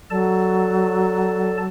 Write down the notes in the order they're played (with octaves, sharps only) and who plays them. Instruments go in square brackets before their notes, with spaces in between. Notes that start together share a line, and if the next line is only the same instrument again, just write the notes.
[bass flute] F#3 [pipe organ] A4 D5 A5